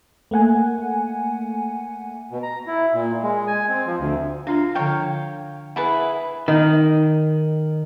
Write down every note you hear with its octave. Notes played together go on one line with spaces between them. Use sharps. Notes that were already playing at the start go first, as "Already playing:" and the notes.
A3 A#3 F#5 G#5
B2
A#5
E4
A#2
G#3
G#5
C4
F3
D2
D4 F4 F5 A#5
D3 F3 C#5 F5 G5
E4 G#4 B4 F#5
D#3